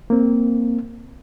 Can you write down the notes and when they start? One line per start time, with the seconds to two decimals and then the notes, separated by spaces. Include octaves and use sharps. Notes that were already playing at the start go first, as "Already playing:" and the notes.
0.10 A#3 C4